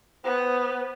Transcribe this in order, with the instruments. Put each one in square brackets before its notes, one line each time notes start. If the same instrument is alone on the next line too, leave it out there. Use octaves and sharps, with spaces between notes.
[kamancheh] B3 [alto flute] C5